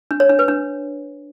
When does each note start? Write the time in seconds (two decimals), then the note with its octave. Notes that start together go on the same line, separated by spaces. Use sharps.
0.11 D4
0.20 C#5
0.29 D4
0.39 B4
0.48 D4